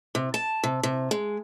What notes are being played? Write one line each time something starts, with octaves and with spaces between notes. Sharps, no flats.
C3
A5
C3
C3
G#3